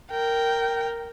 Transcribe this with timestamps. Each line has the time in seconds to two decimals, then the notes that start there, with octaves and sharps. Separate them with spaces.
0.12 A#4 G5